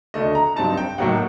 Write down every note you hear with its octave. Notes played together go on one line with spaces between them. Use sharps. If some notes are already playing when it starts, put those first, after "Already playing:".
D2 D3 A3 D#5
A#5
G2 F#3 C4 D#4 A5
G5
A2 F#3 A#3 D#4 F#5